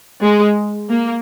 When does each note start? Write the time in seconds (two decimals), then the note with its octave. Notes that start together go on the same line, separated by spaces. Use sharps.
0.23 G#3
0.89 A#3